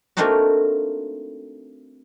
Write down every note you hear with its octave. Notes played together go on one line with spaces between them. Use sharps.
A3 A#3 C4 D4 D#4 F#4